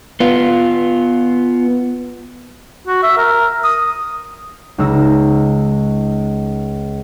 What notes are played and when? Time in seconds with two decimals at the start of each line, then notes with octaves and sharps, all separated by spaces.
0.20 B3 F4
2.87 F#4
3.03 E5
3.17 A#4
3.64 D#6
4.78 C#2 G#3 D#4 E6 A#6